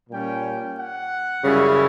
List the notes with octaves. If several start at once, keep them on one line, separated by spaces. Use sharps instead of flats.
A#2 G3 C#4 G5
F#5
F#2 C#3 G3 C#4 E4